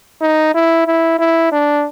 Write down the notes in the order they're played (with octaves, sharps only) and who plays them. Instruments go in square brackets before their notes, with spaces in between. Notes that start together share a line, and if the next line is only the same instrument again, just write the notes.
[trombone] D#4
E4
E4
E4
D4